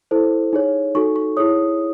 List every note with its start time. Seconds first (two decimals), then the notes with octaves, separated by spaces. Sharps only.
0.11 E4 A4 C5
0.53 D#4 G#4 C#5
0.95 D#4 F#4 A4 C#6
1.16 C#6
1.37 E4 G#4 C#5 D#6